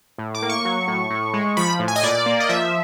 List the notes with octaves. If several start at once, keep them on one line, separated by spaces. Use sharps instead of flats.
A2
D6
A#3
C#6
F#3
A2
A2
G#3
F3 B5
A2
G#5
D#5
A#2 D5
A#3
D#5
F3 E5